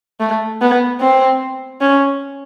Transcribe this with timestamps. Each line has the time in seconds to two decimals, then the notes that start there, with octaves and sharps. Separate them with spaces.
0.20 A3
0.61 B3
1.01 C4
1.81 C#4